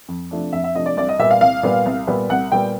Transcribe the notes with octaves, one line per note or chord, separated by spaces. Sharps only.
F2
C3 F3 A3 D4
F2 E5
E5
C3 F3 A3 D4 D#5
D5
C2 D5
D#5
A#2 G3 B3 E5
F5
C2 F5
A#2 G3 B3
C2
A#2 G3 B3
C2 F#5
A#2 G3 B3 G5